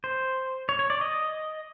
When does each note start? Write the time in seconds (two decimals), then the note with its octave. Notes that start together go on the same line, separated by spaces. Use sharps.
0.04 C5
0.69 C#5
0.79 C#5
0.90 D5
1.01 D#5